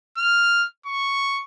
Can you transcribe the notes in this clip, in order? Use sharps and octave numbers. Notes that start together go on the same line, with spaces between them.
F6
C#6